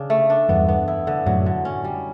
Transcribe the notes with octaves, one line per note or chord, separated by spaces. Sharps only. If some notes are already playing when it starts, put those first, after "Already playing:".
Already playing: C#3 D4
A3
D4
E2 G2 B3
B3
E4
D3
F#2 A2 F#3
D3
C#4
G3